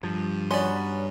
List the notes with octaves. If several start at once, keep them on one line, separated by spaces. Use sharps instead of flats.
G2 F3
F#3 B3 C#4 D5 C6